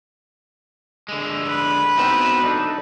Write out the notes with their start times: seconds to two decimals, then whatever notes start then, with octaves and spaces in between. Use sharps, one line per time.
1.08 D3 G#3
1.48 B4
1.98 B3 C4 D#4 F#4 E5
2.44 D4 D#4 A4